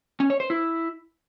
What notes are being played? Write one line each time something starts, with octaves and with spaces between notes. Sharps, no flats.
C#4
C#5
C5
E4